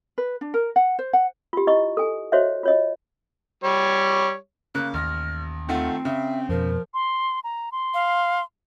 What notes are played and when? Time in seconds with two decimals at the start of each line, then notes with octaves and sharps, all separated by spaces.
0.18 B4
0.41 D4
0.54 A#4
0.76 F#5
0.99 C5
1.13 F#5
1.53 F4 G4
1.67 E4 D#5 C#6
1.97 A4 G#5
2.32 F#4 C5 C#5 D#5 E5
2.63 F4 C#5 D#5
3.64 G3 C#5
4.75 C#3 A#3 F#6
4.94 A1 D#2 F6 A#6
5.69 D#3 A3 C4 F4 F#5
6.05 C#3 E5
6.49 F2 B2 F3 A#4
6.94 C6
7.44 A#5
7.72 C6
7.94 F5